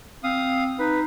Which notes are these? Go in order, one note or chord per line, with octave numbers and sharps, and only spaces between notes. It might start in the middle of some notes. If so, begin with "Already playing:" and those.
C4 F5 D#6
D#4 B4